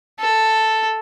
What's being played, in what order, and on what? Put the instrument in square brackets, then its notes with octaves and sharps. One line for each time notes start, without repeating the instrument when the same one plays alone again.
[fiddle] A4